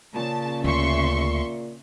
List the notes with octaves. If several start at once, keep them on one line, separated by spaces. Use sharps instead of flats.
A#2 C#3 A5
D2 A#2 E5 C6 C#6